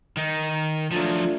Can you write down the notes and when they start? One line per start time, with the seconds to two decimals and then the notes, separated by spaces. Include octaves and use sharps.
0.17 D#3 D#4
0.91 F3 F#3 A3 D4 F4